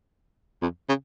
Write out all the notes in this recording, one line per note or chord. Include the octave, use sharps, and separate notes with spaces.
F2
C#3